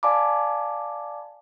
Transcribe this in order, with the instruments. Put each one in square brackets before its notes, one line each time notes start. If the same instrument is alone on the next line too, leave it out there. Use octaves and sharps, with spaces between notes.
[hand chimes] D5 F5 G#5 A5 B5 D6